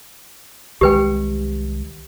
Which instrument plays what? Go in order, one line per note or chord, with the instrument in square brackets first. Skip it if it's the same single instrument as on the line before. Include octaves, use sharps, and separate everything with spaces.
[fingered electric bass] C2 D#3 G#3 [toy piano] G4 B4 G5